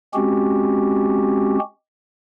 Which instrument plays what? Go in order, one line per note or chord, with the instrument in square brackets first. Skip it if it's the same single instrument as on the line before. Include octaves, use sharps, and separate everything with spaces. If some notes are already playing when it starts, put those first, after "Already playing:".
[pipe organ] G#3 C4 C#4 F#4 G4